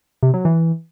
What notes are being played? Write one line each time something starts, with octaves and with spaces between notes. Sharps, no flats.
C3
F#3
E3